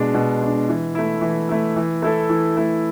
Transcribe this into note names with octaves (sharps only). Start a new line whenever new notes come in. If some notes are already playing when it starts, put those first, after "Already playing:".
Already playing: B2 G#3 D4
B2
G#3 D4
E3
A3 E4
E3
A3 E4
E3
A3 E4 A4
E3
A3 E4 A4